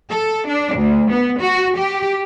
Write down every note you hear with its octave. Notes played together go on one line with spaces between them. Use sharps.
A4
D4
D2
B3
F#4
G4